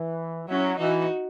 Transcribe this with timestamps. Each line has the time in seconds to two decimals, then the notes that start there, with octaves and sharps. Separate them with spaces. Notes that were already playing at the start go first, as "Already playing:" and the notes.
Already playing: E3
0.48 F#3 C#4 E4
0.78 E3 D#4 F#4